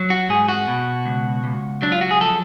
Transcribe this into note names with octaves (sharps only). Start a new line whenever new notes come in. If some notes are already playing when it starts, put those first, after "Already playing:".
Already playing: F#3
F#4
G#2 G#4
F#4
B2
C#2
C#2
F#3 D4
F4
F#4
G#4
F3 A4